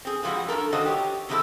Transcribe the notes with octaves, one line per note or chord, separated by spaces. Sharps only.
C4 G#4
A#2 E3 F3 G3 G#3 F#4
G2 A#2 A4 A#4
G2 D#3 D4 F#4 C5 D#5
G4 C#5
C3 D#3 G#3 C4 E4 A4